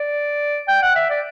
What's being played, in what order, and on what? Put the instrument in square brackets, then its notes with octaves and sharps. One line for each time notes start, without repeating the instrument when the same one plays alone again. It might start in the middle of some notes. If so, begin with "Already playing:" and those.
Already playing: [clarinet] D5
G5
F#5
E5
D5